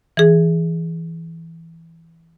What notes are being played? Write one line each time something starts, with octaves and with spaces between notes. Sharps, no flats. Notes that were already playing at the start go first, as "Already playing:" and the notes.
E3 G#4